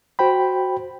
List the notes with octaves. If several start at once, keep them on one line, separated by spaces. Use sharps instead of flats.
F#4 C5 G5 B5